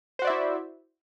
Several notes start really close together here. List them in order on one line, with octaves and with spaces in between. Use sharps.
C5 F#4 D5 E5 E4